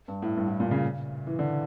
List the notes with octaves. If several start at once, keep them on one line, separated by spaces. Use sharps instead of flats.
G2
A2
G2
A2
A#2
C#3
E3
D3